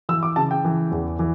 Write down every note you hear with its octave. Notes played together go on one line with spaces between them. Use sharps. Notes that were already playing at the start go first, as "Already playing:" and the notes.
E3 E6
D6
C#3 A5
G5
E3
E2
E3